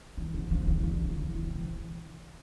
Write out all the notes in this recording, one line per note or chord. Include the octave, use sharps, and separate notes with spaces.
E3
D3
F3
D3
E3
D3
F3
E3
E3
C3